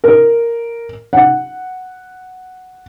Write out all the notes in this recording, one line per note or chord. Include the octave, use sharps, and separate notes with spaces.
A#4
F#5